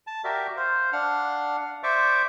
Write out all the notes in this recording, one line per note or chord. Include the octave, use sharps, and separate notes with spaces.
A5
F#4 G4 A#4 D5 E5
C5 F5
D4 F5 F#5 F6
C5 D5 E5 C#6 D6